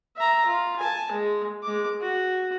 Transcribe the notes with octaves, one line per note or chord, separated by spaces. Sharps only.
E5 A#5
F4
G#5 A5
G#3
G#3 D6
F#4